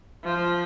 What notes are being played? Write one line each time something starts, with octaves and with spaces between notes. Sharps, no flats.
F3